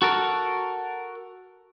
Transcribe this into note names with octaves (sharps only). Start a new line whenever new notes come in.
F#4 A4 A#4